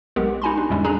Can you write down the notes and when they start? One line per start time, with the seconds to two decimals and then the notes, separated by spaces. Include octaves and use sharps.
0.16 B1 G#3 B3 G4 A#4
0.42 D#4 F#4 G#5 B5 C6
0.57 D4
0.70 E2 A2 D3 G3 G#3 C#4
0.84 D4 G#4 G#5 A#5 B5